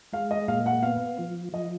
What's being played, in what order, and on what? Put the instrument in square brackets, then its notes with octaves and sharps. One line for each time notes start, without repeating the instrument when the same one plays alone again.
[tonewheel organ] G#3 [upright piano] F5
[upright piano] D#5
[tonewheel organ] A#2 [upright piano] F5
[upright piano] F#5
[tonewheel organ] B3 [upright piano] F5
[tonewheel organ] F3
[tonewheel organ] F3 [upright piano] D#5